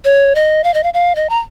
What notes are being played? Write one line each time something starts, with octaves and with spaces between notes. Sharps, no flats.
C#5
D#5
F5
D#5
F5
F5
D#5
A#5